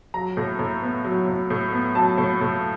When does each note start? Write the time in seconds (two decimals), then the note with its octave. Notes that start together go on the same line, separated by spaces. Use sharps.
0.14 F#3 A#5
0.37 A2
0.59 A2
0.82 B3
1.04 F#3
1.28 A2
1.50 A2
1.72 B3
1.95 F#3 A5
2.18 A2
2.41 A2